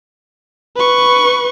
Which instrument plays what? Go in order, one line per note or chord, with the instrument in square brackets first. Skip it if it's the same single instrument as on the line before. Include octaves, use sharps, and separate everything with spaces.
[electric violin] B4 C#6